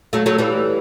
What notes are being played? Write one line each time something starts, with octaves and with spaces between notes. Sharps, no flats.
F#3 A3
F#3 A3
E3 G3